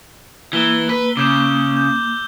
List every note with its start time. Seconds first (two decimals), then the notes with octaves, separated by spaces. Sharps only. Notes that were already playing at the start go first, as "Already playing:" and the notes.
0.53 E3 A#3 E6 G7
0.89 B4
1.17 C#3 D6 G6 E7
1.77 G6